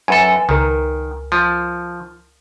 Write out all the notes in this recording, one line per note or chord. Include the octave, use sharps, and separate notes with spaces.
F#2 A4 B4 G#5
C#2 D#3 A#4
F3